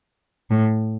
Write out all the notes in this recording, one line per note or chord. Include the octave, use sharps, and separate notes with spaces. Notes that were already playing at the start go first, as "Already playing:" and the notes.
A2